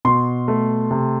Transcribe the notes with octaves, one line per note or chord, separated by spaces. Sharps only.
B2 C6
A3
C3